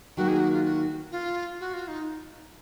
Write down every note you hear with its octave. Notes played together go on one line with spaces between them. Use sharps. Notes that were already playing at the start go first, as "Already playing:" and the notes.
D#3 F#3 A#3 F#4
G#4
F#4
F4
F#4
F4
F#4
F4
D#4